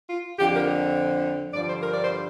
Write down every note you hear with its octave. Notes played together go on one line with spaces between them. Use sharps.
F4
F2 D3 F3 G4
A#4
G2 D3 F3 D5
C5
A#4
D5
C5